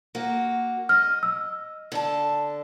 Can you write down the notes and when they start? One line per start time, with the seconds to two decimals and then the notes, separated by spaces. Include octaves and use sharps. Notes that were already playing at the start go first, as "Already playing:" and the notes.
0.15 A#3 F#4
0.89 D#5 F6
1.23 E6
1.92 D3 A5